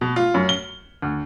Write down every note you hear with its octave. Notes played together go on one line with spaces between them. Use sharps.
B2
F4
F#2
G7
D2